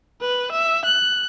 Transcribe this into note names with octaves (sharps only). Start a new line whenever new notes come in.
B4
E5
F#6